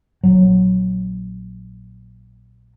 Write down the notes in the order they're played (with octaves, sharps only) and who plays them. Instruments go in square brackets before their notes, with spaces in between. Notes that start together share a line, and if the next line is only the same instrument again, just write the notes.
[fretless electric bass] A#1 F#3